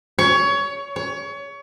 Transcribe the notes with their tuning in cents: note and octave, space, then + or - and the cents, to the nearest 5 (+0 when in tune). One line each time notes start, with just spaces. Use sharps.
C#5 +20
C#5 +25